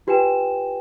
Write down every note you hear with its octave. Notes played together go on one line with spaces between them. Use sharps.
F4 G4 B4 G5 G#5 E7